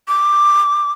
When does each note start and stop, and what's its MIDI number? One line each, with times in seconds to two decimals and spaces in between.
0.08 0.92 86